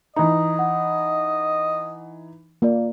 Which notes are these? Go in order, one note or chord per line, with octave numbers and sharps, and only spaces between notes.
E3 D#4 D#5 A#5
F#5
A#3 F4 D5 F5